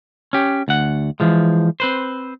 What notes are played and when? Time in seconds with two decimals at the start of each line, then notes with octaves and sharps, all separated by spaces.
0.33 C#4 G4
0.68 D2 F#5
1.20 E3 F3 G#3
1.80 C4 B4 C5